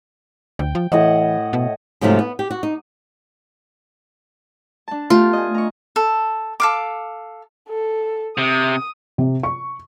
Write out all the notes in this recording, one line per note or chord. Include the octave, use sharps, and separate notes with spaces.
D2 G5
F3
A2 E3 D#5 F#5
B2
G#2 C3 F3 F#3 A3
B3
G4
F#4
D#4
D4 A5
A3 B3 F4 G4
D#5 G#5
A#5 C#6
A4
A4 F5 D6
A4
C3 D#6
C3
C#6